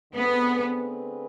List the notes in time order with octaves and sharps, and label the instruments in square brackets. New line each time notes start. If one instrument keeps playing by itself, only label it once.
[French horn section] D3 A3 C4 G#4 B4 [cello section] B3